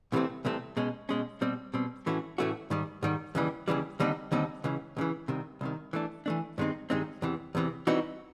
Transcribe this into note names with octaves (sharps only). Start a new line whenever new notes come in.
C2 C3 E3 A3 C4
C2 C3 E3 A3 C4
B2 G#3 C#4
B2 G#3 C#4
B2 G3 C4
B2 G3 C4
A2 E3 A3 C#4 F#4
A2 E3 A3 C#4 F#4
G#2 D#3 G3
G#2 D#3 G3
D#2 C#3 E3 G3
D#2 C#3 E3 G3
D#2 D3 G3 C4 D#4
D#2 D3 G3 C4 D#4
C#2 C#3 E3
C#2 C#3 E3
C2 C3 D#3
C2 C3 D#3
E3 A3 D4
E3 A3 D4
G2 D#3 G#3 C4 D#4
G2 D#3 G#3 C4 D#4
E2 C3 E3
E2 C3 E3
E3 G3 C4 D#4 F#4